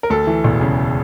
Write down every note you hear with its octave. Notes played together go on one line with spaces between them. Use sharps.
A#4
D2 A4
E3
E1
C#3